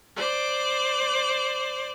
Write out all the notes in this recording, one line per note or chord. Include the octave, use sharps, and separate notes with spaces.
C5 D5 D6